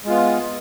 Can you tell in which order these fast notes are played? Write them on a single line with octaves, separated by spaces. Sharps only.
G#3 F4 B3